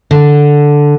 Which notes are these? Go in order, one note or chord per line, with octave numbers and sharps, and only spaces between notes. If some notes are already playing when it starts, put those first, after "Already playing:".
D3